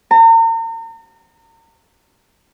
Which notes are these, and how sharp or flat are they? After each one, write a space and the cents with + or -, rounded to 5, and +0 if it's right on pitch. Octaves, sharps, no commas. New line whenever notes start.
A#5 -40